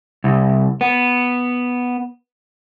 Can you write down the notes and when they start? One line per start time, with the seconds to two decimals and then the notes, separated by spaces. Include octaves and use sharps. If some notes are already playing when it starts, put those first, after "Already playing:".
0.24 C2
0.81 B3